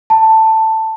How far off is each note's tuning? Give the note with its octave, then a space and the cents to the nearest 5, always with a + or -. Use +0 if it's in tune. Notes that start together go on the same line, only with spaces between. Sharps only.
A5 +10